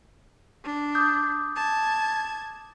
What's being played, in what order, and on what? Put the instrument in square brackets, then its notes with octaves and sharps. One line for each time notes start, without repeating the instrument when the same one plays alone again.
[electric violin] D4
[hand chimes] D6 D#6 G6
[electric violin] A5 G#6